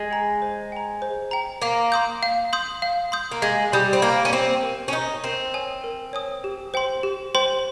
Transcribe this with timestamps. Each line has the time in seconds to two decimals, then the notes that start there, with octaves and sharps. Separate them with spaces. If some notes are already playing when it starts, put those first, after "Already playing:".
Already playing: G#3
0.11 G5 A#5
0.42 C5
0.72 G5 A#5
1.02 C5
1.31 G5 A#5
1.62 A#3 F5
1.92 C6 D#6 G6
2.23 F5
2.53 C6 D#6 G6
2.82 F5
3.12 C6 D#6 G6
3.32 A#3
3.42 G#3 F5
3.72 G3 C6 D#6 G6
3.93 C4
4.02 A#3 A#4
4.25 C#4
4.33 C4 C#5 G#5 D#6
4.63 A#4
4.88 C#4
4.93 D#4 C#5 G#5 D#6
5.24 C4 A#4
5.54 C#5 G#5 D#6
5.84 A#4
6.13 C#5 G#5 D#6
6.44 G4
6.74 C5 G5 C6
7.03 G4
7.35 C5 G5 C6